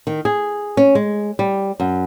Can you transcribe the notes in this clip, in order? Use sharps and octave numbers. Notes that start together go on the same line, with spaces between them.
D#3
G#4
C#4
G#3
G3
F#2